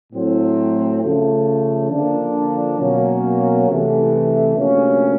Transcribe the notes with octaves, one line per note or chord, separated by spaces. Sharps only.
A2 F#3 A3 C4
C#3 F3 A3
D3 F3 A#3 D4
B2 F#3 A#3 C#4
C3 E3 A3
D2 C3 F3 A#3 C#4